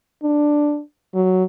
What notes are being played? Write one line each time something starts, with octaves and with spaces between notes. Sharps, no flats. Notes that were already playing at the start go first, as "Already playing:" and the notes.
D4
F#3